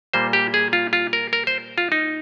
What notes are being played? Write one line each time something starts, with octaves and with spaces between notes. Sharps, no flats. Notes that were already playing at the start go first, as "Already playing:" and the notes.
A#2 G3 A#3 C5
G4
G#4
F4
F4
A#4
A#4
C5
F4
D#4